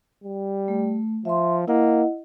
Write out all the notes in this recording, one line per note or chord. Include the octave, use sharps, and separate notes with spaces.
G3
A3
F3 E5 C6
A#3 E4 D#5 F#5